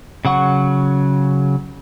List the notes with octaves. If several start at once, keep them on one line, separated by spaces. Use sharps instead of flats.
C#3 F#3 F#5 C#6